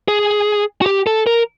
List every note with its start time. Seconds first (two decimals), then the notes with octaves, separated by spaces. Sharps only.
0.08 G#4
0.82 F#4
0.86 G4
1.07 A4
1.27 A#4